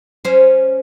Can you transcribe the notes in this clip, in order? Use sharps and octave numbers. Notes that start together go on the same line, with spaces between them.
C#4 C5